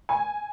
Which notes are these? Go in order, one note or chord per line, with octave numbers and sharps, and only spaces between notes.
G#5